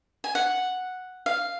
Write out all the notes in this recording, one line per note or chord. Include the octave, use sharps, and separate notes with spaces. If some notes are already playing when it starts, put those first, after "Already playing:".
G#5
F#5
F5